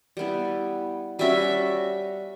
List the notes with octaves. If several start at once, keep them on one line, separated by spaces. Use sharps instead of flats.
G3 B3 E4
G3 C#4 F#4 E5